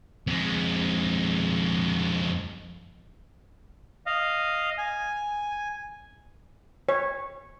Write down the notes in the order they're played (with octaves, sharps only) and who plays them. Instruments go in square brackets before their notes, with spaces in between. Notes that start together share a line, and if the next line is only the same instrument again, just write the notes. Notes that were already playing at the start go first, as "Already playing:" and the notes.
[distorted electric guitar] F2 G#3
[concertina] D#5 F5
G#5
[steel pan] C#5